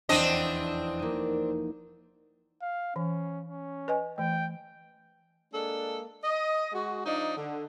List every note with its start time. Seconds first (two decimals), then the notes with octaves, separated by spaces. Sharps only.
0.09 F1 E2 C4 D4 D#5 G5
0.99 A#3 D#4
2.62 F5
2.96 E3 C#4
3.48 C#4
3.88 B4 D#5 G#5
4.18 E3 A3 G5
5.52 G#3 A#3 D4 A4
6.23 D#5
6.72 G#3 F#4
7.05 F3 D4 D#4
7.35 D3